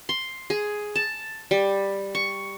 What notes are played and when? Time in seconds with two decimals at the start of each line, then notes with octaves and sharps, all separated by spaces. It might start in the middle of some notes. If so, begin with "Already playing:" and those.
0.09 C6
0.50 G#4
0.95 A5
1.51 G3
2.15 C#6